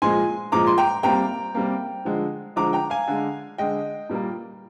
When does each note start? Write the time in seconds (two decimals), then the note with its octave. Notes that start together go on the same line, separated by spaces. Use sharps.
0.02 A#2 F3 G#3 G#5 C6
0.52 A#2 F3 G#3 A#5 D6
0.67 C6
0.78 G5 A#5
1.03 C3 G3 A#3 G5 A#5
1.55 C3 G3 A#3
2.05 D3 F3 G#3
2.56 D3 F3 G#3 A#5 D6
2.73 G5 A#5
2.90 F5 G#5
3.07 D3 G#3
3.58 D3 G#3 D#5 G5
4.09 A#2 G3 A#3